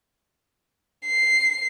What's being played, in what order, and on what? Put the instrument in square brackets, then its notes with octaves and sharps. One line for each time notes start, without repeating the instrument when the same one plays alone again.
[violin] C7